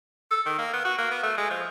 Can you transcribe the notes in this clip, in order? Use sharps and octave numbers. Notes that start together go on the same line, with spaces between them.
A4
D#3
A#3
B3
F#4
A#3
B3
A3
G#3
F3